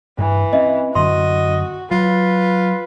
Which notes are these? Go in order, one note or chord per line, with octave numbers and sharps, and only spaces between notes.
G2 E3
C4 C#4 D#5 E5
F#2 D3 B3 F#4 D#5 C6
F#3 F4 B4